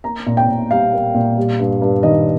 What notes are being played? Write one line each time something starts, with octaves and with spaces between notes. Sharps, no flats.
A#3 A#5
A#2
G5
A#2
G3 F5
A#3
A#2
G3
G2
G2
D#3 D#5